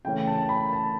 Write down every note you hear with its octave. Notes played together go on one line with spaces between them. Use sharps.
C#3 E3 A3 C#4 G5
A5
B5
A5